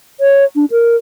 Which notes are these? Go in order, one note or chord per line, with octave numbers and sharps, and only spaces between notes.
C#5
D4
A#4